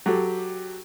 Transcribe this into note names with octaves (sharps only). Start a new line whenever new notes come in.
F#3 G4 A4